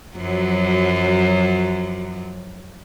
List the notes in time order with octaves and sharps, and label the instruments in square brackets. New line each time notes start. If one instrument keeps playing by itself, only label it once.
[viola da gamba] F#2 F3 F#3